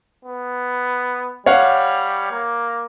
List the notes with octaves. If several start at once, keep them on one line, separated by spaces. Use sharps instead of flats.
B3
G3 C#5 F5 F#5
A#3